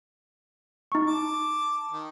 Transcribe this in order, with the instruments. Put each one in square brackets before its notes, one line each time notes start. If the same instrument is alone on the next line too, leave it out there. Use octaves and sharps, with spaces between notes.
[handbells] D#4 C#6
[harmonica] A5 D6
D#3